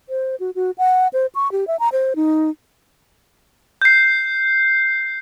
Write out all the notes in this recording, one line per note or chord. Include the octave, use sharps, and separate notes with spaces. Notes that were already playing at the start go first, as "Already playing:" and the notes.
C5
F#4
F#4
F#5
C5
C#6
G4
E5
A#5
C5
D#4
G6 C7